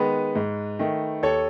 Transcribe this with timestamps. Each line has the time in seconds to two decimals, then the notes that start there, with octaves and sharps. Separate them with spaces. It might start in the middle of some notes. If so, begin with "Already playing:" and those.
Already playing: D#3 G#3 B3 B4
0.35 G#2
0.79 D#3 A3
1.23 D#2 A4 C#5